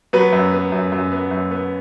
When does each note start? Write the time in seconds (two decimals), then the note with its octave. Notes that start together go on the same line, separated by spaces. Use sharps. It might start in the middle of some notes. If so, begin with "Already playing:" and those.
0.13 F#3 B3 B4
0.33 F#2
0.53 B3
0.72 F#2
0.92 F#2
1.12 B3
1.31 F#2
1.51 B3